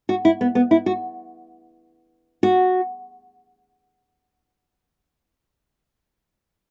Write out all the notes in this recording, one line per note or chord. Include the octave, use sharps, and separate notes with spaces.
F#4
E4
B3
B3
E4
F#4
F#4